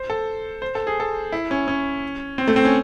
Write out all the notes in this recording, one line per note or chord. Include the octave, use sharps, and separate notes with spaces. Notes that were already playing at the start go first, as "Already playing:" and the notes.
Already playing: C5
A4
C5
A4
G#4
A4
E4
C#4
C#4
C4
A3
C4
C#4